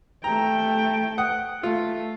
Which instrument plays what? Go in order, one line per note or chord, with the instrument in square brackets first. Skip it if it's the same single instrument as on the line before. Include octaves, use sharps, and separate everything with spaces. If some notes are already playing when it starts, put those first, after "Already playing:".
[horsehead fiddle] A3 G5 [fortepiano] A#5
[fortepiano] F#5 D#6
[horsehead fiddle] A3 [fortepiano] F4